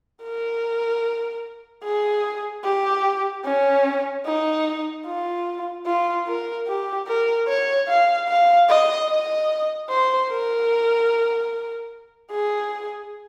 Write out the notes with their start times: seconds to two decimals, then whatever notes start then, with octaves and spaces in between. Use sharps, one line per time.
0.23 A#4
1.84 G#4
2.64 G4
3.45 C#4
4.26 D#4
5.06 F4
5.86 F4
6.27 A#4
6.67 G4
7.08 A#4
7.48 C#5
7.88 F5
8.29 F5
8.69 D#5
9.09 D#5
9.90 C5
10.30 A#4
12.31 G#4